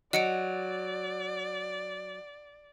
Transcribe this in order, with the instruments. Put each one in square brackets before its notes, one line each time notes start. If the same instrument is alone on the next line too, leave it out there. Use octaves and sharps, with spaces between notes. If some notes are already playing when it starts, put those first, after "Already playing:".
[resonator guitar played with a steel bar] F#3 [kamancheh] D5 [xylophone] D#5 C#7 D7